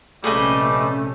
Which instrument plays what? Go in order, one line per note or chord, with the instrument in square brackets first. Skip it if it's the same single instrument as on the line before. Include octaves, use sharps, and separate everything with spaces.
[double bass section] A#1 C3 C#4 [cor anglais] G3 [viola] A3 [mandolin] G#4 B4 D#5